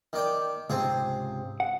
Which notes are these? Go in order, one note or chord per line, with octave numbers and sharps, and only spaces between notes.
D#3 D5 G5
C#2 G#2 C3 C4 G#4
F#5